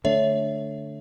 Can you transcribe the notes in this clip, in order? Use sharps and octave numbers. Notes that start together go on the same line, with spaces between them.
D3 A3 D4 C#5 E5